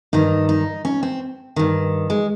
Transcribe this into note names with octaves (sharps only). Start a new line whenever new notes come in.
G2 D#3 D#4
D#4
C#4
C4
G2 D#3
G#3